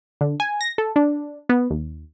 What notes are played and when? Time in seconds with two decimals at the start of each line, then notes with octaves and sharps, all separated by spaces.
0.21 D3
0.40 G#5
0.61 A#6
0.78 A4
0.96 D4
1.49 B3
1.70 D#2